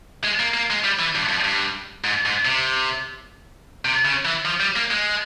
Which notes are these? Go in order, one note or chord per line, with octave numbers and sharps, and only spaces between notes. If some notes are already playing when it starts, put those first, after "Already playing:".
G#3
A#3
A#3
G#3
G3
E3
G2
F2
G2
G#2
G#2
C3
C3
C#3
E3
F3
G3
A#3
G#3